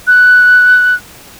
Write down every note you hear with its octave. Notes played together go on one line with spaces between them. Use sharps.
F#6